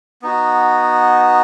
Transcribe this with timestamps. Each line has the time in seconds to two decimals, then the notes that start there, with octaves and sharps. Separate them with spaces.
0.22 B3 D#4 F#4